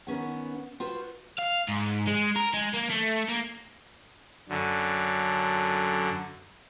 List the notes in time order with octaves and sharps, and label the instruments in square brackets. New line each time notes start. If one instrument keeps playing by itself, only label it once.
[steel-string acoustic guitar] D#3 B3 C#4 F#5
F4 F#4 B4 C5
[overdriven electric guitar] F5
G#2
G#3
A#4
G#3
A#3
A3
A#3
[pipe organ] F#2 D3